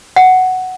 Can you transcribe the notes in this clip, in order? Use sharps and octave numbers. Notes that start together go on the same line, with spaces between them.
F#5